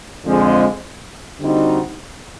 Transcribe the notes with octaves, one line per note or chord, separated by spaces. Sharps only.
F2 D3 F3 G#3
D3 G3 C4 D#4 F#4